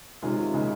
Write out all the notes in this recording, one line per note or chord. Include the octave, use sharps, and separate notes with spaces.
C3 D#3 G#3 C#4 F4
C#3 G#3 D#4 G#4